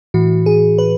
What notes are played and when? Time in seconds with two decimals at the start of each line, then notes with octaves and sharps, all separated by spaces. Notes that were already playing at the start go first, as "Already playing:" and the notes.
0.14 A2 E3 F#4
0.46 G#4
0.78 B4